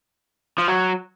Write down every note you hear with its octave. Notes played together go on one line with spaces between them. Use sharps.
F3
F#3